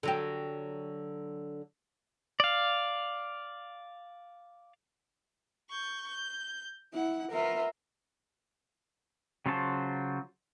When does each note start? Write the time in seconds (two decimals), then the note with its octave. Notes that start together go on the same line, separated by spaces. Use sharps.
0.03 D3 F#3 G4
2.40 D5 F5
5.70 C#6 G6
6.08 G6
6.94 E4 F#5
7.32 B3 F4 A#4 E5
9.46 C#3 F#3 F4 C5 A5